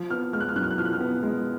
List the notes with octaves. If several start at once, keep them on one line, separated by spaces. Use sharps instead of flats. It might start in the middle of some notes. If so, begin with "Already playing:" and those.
Already playing: F3
B3 F6
G#3 F6
F#6
F6
F#2 F#6
F6
F#6
F3 F6
F#6
F6
B3
G#3